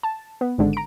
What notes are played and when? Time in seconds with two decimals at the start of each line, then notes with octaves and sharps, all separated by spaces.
0.03 A5
0.41 B3
0.58 G#1 G#2 D3
0.73 A#5 D7